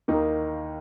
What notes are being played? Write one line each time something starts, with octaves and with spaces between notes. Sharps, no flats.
D#2 D#3 A#3 D#4